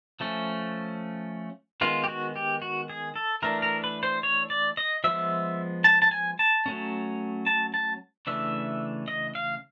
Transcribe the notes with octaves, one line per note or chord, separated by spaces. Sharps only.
F3 A3 C#4
D#3 G#3 B3 F4
G4
F#4
G4
F#4
G#4
A4
E3 A3 D4 A#4
A#4
B4
C5
C#5
D5
D#5
F3 G#3 B3 E5
A5
A5
G#5
A5
F#3 A3 C#4
A5
A5
C#3 E3 A3 D4 E5
D#5
F5